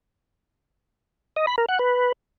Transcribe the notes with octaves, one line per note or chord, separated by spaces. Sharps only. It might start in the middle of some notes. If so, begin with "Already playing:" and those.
D#5
B5
A#4
F#5
B4